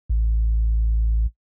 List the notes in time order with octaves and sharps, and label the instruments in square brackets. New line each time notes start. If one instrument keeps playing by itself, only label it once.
[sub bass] A1